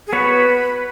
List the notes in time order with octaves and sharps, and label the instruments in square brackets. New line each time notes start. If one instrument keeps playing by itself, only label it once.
[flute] G#4
[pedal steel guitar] B3 F#4 C#5 [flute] B4